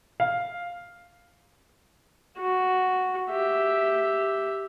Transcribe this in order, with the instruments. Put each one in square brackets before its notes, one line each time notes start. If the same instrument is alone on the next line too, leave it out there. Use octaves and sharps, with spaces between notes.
[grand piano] F5
[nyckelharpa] F#4
G4 E5